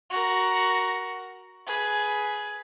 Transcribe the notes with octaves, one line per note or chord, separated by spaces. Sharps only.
F#4 A#4
G#4 B4